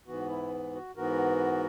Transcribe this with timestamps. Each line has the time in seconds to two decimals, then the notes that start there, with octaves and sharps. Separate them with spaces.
0.07 G#2 E3 B3 F#4
0.29 E4
0.74 F#4
0.96 G#2 E3 B3 F#4 A#4